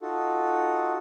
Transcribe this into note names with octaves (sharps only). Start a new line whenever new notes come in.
D#4 F4 F#4 A4